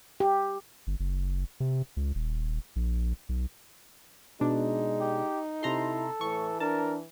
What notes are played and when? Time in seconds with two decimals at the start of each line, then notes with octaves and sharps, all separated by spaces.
0.20 G4
0.87 G1
1.00 F#1
1.60 C3
1.97 C#2
2.15 D#1
2.76 A#1
3.29 B1
4.41 B2 G#3 D4 D#4
5.00 G4
5.63 C3 E4 A4 A#5 C6
6.21 A2 E3 C#6
6.60 D4 A#4 A5